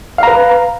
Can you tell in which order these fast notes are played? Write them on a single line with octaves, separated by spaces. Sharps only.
F5 A#5 B4